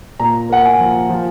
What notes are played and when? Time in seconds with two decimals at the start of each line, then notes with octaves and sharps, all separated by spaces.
0.20 A#2 A#5
0.50 A#3 F#5
0.65 G#5
0.80 F3
1.09 F3